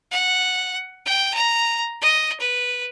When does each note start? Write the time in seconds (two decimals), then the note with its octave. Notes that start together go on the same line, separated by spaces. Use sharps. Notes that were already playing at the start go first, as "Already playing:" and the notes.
0.11 F#5
1.05 G5
1.34 A#5
2.01 D#5
2.40 B4